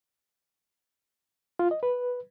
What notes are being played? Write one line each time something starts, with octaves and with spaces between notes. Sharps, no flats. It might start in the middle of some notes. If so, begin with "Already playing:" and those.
F4
D#5
B4